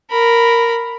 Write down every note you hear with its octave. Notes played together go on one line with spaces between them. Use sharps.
A#4 B5